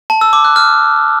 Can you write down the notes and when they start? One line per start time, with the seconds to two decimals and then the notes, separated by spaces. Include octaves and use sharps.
0.10 A5
0.21 E6
0.33 D6
0.44 F#6
0.56 F6